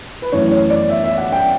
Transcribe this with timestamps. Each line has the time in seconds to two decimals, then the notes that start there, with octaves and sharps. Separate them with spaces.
0.22 B4
0.32 F#2 E3 A3 C#5
0.51 C#5
0.70 D5
0.89 E5
1.04 E5
1.18 F#5
1.32 G5